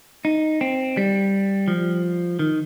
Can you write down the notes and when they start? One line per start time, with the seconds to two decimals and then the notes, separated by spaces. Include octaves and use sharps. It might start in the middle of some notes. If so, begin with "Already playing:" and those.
0.25 D#4
0.61 C4
0.97 G3
1.68 F3
2.39 D#3